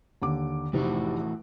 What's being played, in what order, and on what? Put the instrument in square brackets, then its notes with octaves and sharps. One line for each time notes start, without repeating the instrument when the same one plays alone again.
[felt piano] D#2 D3 D6
[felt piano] F1 C3 D#4 [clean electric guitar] A2 E3 F#4